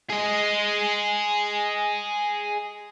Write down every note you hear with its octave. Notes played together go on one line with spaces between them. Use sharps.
G#4 D#5